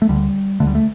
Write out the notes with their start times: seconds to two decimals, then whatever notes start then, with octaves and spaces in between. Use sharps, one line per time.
0.02 A3
0.09 D2 D3 G3
0.60 D2 D3 A3
0.67 G3
0.75 A3